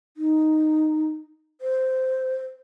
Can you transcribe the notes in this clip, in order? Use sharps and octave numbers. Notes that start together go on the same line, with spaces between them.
D#4
C5